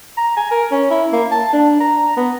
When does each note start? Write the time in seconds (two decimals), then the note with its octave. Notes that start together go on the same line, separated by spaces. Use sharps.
0.17 A#5
0.37 G#5
0.51 A#4
0.72 C#4
0.90 E4
1.13 A#3
1.31 A5
1.53 D4
1.80 A#5
2.17 B3